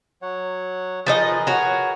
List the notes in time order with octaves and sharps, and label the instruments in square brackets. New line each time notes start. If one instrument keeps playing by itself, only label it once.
[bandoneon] F#3 C#5 F#5
[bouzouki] F3 D#4 D#5 [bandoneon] G#4 A#4 B4
[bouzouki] F#4 C#5